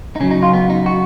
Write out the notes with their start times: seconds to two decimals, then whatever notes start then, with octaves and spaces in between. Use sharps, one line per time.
0.16 D#4
0.20 C#3 F#3 C#4
0.31 D#4
0.43 F4
0.54 B3
0.70 D#4
0.86 F#4